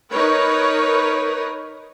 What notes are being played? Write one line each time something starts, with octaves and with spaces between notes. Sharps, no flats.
D#4 A#4 B4 C#5